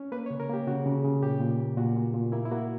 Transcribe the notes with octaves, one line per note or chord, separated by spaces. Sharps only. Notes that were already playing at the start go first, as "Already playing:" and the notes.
Already playing: C#4
A#3 B4
C#5
C#3
A#4
A#3 G4
C#3 F#4
C#3
C#3
A#2 G4
A#2
A#3
A#2 F#4
A#2
A#2
A#3 E4
E4
A#3 F#4